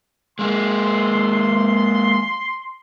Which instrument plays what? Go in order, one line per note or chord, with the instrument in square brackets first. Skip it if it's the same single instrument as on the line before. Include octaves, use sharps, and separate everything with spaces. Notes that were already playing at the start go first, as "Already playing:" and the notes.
[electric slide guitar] G#3 A#3 G#4 [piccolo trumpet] C6